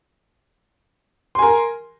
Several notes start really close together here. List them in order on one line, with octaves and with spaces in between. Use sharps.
C6 G#5 A#4